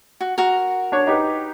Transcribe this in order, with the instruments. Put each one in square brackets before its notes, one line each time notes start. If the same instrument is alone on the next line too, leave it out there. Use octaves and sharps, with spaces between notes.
[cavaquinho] F#4
F#4 A#4
[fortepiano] D4 C#5
D#4 G4 B4